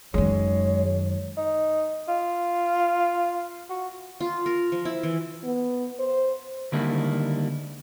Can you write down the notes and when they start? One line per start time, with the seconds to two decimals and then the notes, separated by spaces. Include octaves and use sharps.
0.14 F#2 D#3 G#3 C#5
1.37 D#4
2.08 F4
3.70 F#4
4.20 F4
4.46 A#4
4.72 F3
4.85 E4
5.03 E3
5.44 B3
5.99 C5
6.72 D3 D#3 G3 G#3 A#3 E4